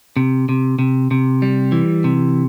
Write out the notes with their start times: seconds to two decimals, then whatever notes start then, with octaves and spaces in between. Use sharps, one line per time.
0.17 C3
0.49 C3
0.79 C3
1.11 C3
1.42 G3
1.72 E3
2.04 C3